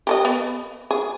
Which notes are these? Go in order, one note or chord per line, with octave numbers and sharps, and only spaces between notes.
G4 A4 D#5
B3
G#4